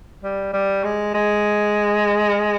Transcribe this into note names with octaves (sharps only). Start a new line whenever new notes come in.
G3
G3
G#3
G#3